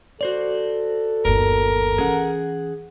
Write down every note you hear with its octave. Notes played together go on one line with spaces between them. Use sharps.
F#4 A4 C5 D5
G1 D#2 A#4
E3 C#4 G#4 F#5